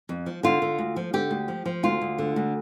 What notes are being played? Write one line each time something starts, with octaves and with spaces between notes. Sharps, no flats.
F2
F3
D3 F4
D3
D2
F3
D3 G4
D2
F3
F3
D2 F4
D2
D3
D2